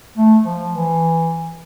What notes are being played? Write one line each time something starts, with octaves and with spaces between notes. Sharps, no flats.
A3
F3
E3